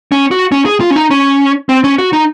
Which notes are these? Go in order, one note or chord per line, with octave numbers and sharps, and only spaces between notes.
C#4
F#4
C#4
G#4
F4
C#4
D#4
C#4
C4
C#4
F#4
D#4